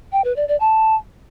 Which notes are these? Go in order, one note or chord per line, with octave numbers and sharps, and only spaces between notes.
G5
B4
D5
D5
A5